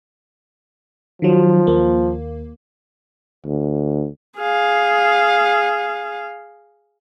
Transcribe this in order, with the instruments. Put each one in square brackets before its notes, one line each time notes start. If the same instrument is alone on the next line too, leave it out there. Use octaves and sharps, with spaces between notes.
[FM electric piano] D#3 F#3 [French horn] F3
[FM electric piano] D#2 A#3
[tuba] D2
[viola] G#4 F5